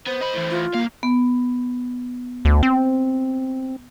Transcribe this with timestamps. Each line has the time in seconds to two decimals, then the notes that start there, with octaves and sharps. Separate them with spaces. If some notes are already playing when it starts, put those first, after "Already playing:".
0.07 B3 C5
0.21 D#5 B5
0.34 A2 E3
0.51 F4
0.75 C2 A#3 F5
1.03 B3
2.45 D2
2.63 C4